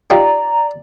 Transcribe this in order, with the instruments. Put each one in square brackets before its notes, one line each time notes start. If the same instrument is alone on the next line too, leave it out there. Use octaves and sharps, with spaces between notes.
[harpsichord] D#4 F4 G4 [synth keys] D5 [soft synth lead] A#5